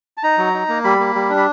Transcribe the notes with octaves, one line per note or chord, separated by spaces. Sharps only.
A5
D#4 A#5
F#3
D#4
A#3
G3 B5
A#3
G3
D4
B5